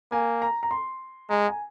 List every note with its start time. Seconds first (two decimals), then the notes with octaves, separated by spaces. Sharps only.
0.11 A#3 G#5
0.42 A#5
0.63 A#5
0.71 C6
1.29 G#3 A#5
1.48 G#5